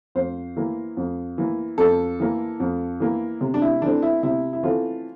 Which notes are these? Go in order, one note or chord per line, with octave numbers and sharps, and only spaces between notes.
F2 C5
E3 A#3
F2
E3 A#3
F2 A4
E3 A#3
F2
E3 A#3
C3
D4
E4
E3 A3 C4 D4
E4
C3 E4
E4
E3 A3 C4 F4